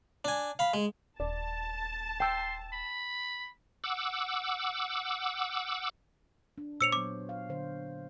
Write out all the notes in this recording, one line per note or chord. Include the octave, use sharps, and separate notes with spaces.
D4 G#5
F5 B5
G#3
D#1 D5 A5
G5 C6 E6
B5
F#5 D6 E6
D4
A#2 C5 C#5 E6 C#7 F7
F#3 B3 D6
F5
D3 C5